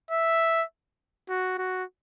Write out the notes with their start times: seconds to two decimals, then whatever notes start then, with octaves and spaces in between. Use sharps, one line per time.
0.11 E5
1.29 F#4
1.58 F#4